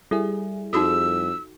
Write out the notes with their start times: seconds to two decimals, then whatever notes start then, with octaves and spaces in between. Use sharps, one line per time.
0.11 G3 E4 G#4 A4
0.73 F2 D#4 F#4 A4 E6